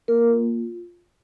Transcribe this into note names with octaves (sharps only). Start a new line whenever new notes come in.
A#3 A#4
F4